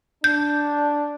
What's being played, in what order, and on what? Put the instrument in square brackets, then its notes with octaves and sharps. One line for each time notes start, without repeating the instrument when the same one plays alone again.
[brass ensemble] D4 [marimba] G6